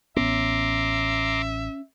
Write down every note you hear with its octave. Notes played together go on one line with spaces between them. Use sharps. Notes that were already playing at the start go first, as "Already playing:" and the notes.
A1 B3 C#4 E5 A#5 C6 D6